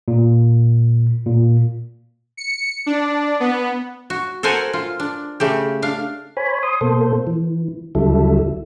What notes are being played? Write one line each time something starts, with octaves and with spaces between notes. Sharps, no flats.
A#2
A#2
C#7
D4
B3
F#4
A4 A#4 C5 F#5 G#5
F4
D4
C#3 A3 G4
D4 F5
C5 C#5 G#5 B5
C6 D#6
B2 A#3 A4 C5
E3
D2 C#3 F#3 G3 E4 A4